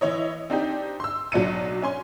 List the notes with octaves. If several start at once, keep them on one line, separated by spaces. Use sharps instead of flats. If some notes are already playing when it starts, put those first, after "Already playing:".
E3 E4 C#5 D#5
C4 D4 D#4 G4
C6 E6
B1 F#3 D4 C#7 D#7
C#4 G#5 C6